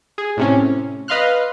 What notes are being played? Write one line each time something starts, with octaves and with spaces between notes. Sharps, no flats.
G#4
A2 C3 C#4
B4 D#5 F5 C6 F6 F#6